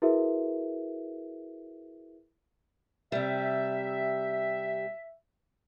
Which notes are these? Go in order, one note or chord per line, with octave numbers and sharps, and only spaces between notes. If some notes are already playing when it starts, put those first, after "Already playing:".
E4 F#4 G#4 A#4 B4 E5
C3 G3 E5